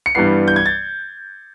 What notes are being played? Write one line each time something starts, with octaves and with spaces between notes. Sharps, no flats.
C#7
G2 E3 G3 B3 C7
G6
G#6
A6